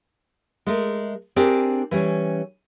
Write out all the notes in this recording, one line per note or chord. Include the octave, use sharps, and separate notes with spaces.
G#3 A3 A#4
C4 D4 G4 G#4 A#4 D5
E3 G3 C#4